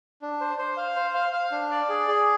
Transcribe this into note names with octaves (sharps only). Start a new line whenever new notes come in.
D4
C5
C5
F5
C5
F5
F5
D4
D5
G#4
G#4